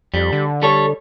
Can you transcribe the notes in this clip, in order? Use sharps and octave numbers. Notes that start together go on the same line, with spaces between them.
F2 G3
D3
G3 A4 C#5